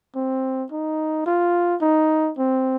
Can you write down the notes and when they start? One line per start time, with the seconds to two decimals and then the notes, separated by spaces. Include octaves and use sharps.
0.15 C4
0.72 D#4
1.26 F4
1.82 D#4
2.38 C4